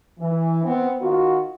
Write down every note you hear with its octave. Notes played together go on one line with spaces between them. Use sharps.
E3
B3 C4
D#3 F4 F#4